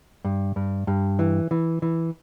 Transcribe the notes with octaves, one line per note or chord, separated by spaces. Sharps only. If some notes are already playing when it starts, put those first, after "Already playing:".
G2
G2
G2
E3
E3
E3